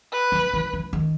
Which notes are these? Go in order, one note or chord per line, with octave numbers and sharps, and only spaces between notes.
B4
F3
E3
E3
D#3